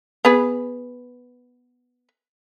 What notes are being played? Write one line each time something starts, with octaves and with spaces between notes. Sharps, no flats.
B3 G#4 B4